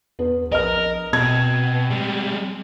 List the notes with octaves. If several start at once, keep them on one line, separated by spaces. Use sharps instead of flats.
E2 B3
A#1 A#4 D#5 F6
B2 C4 G#6
G3 G#3